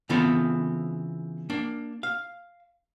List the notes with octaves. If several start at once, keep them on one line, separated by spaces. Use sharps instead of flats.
C#3 E3 B3 C4 F4 A4
A#3 D4
F5